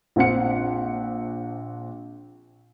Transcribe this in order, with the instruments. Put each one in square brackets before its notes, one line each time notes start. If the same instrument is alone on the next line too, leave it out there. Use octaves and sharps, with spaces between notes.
[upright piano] A#1 C4 F#5 C#7